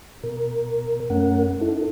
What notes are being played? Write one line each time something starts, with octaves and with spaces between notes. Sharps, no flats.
B2 A#4
F#2 A3 C#4 A#4 F#5
D#4 E4 A4